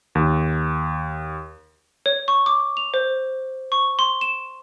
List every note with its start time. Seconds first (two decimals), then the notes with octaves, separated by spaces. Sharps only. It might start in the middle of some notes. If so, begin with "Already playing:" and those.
0.15 D#2
2.06 C#5
2.28 C#6
2.46 D6
2.77 F7
2.94 C5
3.72 C#6
3.99 C6
4.21 E7